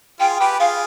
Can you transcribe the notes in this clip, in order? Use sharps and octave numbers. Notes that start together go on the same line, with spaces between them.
F4 G#4 G5
G4 B4 G5
F4 G#4 F5